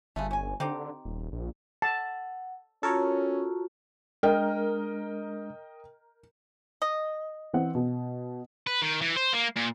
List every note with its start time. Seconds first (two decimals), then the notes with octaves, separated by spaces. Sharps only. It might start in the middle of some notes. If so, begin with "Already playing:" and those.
0.16 G1 C#3 G#3 A3
0.31 C#4 G#5
0.60 D3 C4 D#4 G4
1.05 D#1
1.32 A#1
1.82 F#5 A5
2.83 C#4 F4 F#4 A4 A#4 C#5
4.23 G#3 D4 A#4 D#5 G5
6.82 D#5
7.53 E3 C4 F#5
7.75 B2
8.67 B4
8.82 D#3
9.01 E3
9.16 C5
9.33 A#3
9.56 A#2